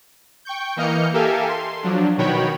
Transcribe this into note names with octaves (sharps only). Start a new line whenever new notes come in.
G5 C#6 G6
E3 A#3 D#5 F6 G6 C#7
G4 A4 A#4 E5 F5 G#5
C6
F3 F#3 D4
B2 D#3 F#4 C#5 G5 B5